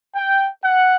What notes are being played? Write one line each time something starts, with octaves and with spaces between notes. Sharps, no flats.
G5
F#5